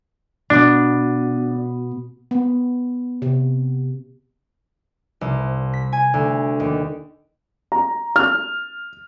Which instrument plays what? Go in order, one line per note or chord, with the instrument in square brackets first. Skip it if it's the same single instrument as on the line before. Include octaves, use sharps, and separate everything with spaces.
[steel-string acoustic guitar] B2 [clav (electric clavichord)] D4
[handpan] B3
C3
[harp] C2
B6
G#5
D2
D#2
[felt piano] A#5
F6